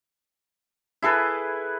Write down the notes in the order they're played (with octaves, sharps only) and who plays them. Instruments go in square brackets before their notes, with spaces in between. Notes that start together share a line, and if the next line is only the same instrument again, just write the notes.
[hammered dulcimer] E4 G#4 A4 B4